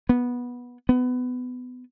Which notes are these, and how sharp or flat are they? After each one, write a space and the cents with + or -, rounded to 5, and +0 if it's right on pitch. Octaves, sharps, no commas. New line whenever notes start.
B3 -15
B3 +20